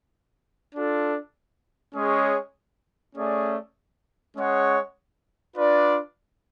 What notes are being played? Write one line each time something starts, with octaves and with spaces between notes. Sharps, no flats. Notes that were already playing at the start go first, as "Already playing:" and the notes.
D4 F4 A4
G#3 C#4 G#4 C#5
A3 C#4 G#4 D5
G#3 C#4 G#4 C#5 F#5
D4 F4 B4 D5